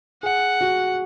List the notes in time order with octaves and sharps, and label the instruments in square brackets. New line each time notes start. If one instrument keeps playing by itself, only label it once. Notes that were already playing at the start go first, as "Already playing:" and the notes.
[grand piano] G#4 [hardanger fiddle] F#5
[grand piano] F#4